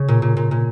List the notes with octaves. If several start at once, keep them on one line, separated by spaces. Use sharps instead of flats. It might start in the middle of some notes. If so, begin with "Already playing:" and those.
Already playing: C#3 G#4
A#2
A#2
A#2
A#2